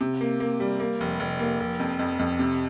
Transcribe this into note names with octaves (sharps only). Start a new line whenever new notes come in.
C3
A#3
A#3
G3
A#3
F1
F1
A#3
F1
F2
F2
F2
C3